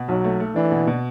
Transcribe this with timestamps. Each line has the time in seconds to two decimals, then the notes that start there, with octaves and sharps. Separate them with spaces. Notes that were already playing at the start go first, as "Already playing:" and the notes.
Already playing: B2
0.08 B1 F#3
0.24 A3
0.40 A3
0.55 E3 D4
0.72 B2
0.87 B2